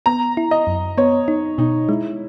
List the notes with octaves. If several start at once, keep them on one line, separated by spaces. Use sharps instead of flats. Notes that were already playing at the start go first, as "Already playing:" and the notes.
B3 A#5
E4
D#5
F#2
B3 C#5
D#4
B2 D#4
G#3 E4